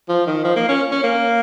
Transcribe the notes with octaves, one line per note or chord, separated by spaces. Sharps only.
F3
D#3
F3
A#3
C#4
C#4
A#3